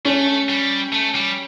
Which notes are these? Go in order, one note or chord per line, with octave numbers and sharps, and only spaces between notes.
A3 C#4
G3
A3
G3